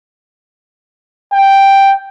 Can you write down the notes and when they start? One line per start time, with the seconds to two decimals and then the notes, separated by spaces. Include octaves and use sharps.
1.33 G5